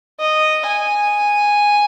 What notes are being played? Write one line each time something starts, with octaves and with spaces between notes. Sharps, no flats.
D#5
G#5